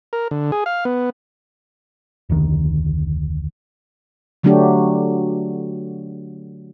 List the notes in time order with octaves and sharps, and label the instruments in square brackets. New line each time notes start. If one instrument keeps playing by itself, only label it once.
[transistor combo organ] A#4
D3
G#4
F5
B3
[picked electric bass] F1 D2 D#3
[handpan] D3 F#3 A3 D4 F#4 G4